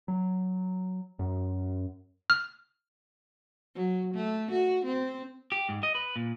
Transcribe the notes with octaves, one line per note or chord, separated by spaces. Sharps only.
F#3
F#2
F6
F#3
A3
F#4
C4
G4
G#2
D#5
B4
A#2